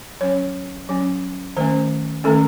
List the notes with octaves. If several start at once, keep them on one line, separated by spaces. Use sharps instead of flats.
F#3 C#4 C#5
F#3 C#4
D#3 A3 C#4 C5
D#3 A3 C#4 A4